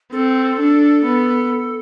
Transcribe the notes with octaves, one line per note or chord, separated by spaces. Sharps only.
C4 A4
D4
B3